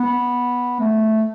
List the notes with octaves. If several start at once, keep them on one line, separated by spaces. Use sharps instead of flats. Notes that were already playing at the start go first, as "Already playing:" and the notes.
Already playing: B3
A3